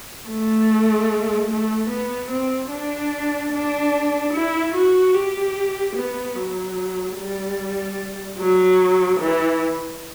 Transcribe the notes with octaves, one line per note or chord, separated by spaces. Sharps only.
A3
A3
B3
C4
D4
D4
E4
F#4
G4
B3
F#3
G3
F#3
E3